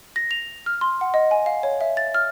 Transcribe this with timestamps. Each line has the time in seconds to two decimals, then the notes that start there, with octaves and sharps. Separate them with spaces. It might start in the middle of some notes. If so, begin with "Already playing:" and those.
0.16 A#6
0.31 F7
0.66 F6
0.81 C6
1.01 F#5
1.14 D#5
1.31 G#5
1.46 F5
1.63 C#5
1.81 E5
1.97 A6
2.14 F6